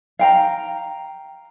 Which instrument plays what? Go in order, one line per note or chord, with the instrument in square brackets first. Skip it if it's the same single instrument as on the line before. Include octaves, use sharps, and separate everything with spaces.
[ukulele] F5 G5 A#5